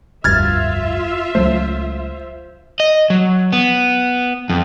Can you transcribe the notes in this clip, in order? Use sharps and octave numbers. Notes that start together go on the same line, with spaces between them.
F1 D2 G2 F4 E5 F6 G#6 A6
C#2 F#3 A3 C5
D#5
F#3
B3
F2